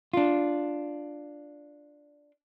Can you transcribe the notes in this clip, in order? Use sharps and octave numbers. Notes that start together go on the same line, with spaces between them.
D4 F4